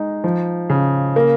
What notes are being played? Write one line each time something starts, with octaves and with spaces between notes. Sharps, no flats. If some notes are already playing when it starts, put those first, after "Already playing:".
Already playing: G#3 D#4
F3
C#3
A#3